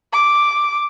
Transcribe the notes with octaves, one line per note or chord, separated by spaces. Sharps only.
D6